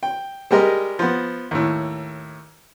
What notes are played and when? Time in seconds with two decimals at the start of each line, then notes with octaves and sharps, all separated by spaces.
0.03 G5
0.51 G3 G#3 G4 A#4 D#5
0.99 F3 B3
1.51 D#2 A2